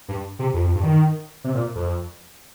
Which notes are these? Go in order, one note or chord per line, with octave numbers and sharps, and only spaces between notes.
G2
C3
F2
F2
G2
D#3
C3
A#2
F2